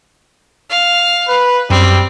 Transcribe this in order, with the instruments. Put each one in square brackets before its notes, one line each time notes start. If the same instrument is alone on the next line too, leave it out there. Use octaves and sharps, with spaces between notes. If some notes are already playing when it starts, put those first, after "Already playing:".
[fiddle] F5
[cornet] B4
[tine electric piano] F#2 [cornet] G3 [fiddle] C4